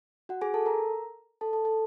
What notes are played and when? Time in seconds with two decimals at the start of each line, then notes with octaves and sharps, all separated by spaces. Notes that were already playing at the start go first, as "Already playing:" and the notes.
0.29 F#4 F#5
0.41 G#4 G#5
0.54 A4 A5
0.66 A#4 A#5
1.41 A4 A5
1.53 A4 A5
1.65 A4 A5